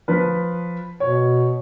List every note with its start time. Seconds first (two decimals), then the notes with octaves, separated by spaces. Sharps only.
0.08 F3 B4
1.00 B2 C#5